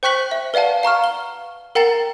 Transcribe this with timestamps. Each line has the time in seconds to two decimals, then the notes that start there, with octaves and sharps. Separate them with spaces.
0.03 C5 G5 C#6 F#6 B6 F#7
0.31 E5
0.54 B4 D5 F5 F#5 A5
0.83 F5 A#5 C#6 F6
1.04 G7
1.75 A#4 F#5 G5 A#5 A6